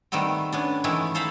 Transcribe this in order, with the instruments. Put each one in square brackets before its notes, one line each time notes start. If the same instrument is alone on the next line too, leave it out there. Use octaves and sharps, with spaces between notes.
[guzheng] D#3 G3 A3 B3 C4
B3 C#4 D4
D#3 E3 G#3 A3 E4
A4 C5 F5 A#5 B5